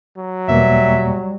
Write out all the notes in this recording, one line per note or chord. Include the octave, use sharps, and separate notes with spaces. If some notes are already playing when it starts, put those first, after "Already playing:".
F#3
E2 B2 G3 A#3 E5